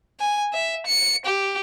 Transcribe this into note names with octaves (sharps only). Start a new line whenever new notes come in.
G#5
E5
C#7
G4